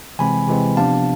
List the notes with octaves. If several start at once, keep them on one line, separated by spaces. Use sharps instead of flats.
C3 E3 G#3 C4 G#5 B5
C3 E3 G#3 C4
C3 F3 B3 D4 F5 A5